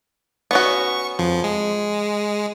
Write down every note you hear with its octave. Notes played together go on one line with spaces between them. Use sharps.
B3 C#4 F#4 C#6
F2 F3
G#3